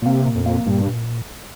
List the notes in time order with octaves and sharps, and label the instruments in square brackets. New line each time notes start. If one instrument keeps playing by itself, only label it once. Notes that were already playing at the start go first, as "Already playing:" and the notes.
[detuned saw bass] A#2
[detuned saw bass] C3 [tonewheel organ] A#3
[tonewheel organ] A#2
[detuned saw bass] F2
[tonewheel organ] A#3
[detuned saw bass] G2 [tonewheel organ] A#2
[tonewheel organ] A#2